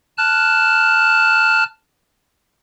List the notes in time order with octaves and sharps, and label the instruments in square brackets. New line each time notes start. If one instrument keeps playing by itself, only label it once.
[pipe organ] A5 F6 F#6